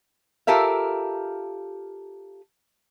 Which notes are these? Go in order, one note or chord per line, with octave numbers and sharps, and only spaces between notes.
F4 G4 A4 A#4 E5 F5